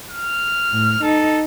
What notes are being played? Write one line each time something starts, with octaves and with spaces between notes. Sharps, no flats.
F6
A2
D#4 A4